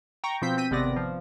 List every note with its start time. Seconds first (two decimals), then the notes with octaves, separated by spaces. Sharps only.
0.24 G5 A#5 C#6
0.42 B2 F3 C4 G6 B6
0.57 C4 G6 B6 D#7
0.71 G#1 C3 B3 D5 A#6
0.96 F3